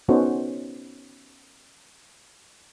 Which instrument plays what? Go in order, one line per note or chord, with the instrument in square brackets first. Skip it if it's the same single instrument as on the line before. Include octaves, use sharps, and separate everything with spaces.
[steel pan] B3 C#4 D#4 F#4 A4 C5